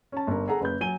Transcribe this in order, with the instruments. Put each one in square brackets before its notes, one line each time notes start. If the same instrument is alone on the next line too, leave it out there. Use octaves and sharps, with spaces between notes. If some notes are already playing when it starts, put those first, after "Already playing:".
[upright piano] C#4 A5
G1 A#4
G#4 A4 F#5 A#5
F#1 B4 G6
F#3 G#5 D#7 G7